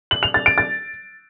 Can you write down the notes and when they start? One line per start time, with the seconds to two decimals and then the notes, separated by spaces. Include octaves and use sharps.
0.11 F#7
0.23 F7
0.34 A6
0.46 D7
0.58 A6